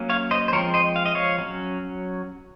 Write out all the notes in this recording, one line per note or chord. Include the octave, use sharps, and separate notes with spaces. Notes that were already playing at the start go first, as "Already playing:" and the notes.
Already playing: F#3 A#3 C#4
C#5 F5
C5 D#5
C5
F3 G#3 C4 A#4 C#5
C5 D#5
F5
D#5
C#5 F5
F#3 C#4